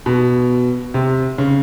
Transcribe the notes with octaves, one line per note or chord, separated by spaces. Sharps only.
B2
C3
C#3